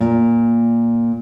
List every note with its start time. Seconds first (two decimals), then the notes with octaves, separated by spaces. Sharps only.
0.01 A#2